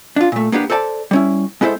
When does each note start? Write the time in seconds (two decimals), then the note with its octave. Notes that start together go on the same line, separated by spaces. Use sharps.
0.16 D4 F4
0.32 A#2 A3
0.52 A#3 B3 D4 G4
0.70 A4 C5 D5 G#5 A5
1.11 G3 C#4 E4
1.61 G#3 B3 E4 A4 C5